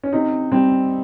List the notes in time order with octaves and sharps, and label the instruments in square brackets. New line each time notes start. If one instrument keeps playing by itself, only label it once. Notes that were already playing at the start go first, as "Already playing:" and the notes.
[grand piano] C#4
C3 D#4
G3 C4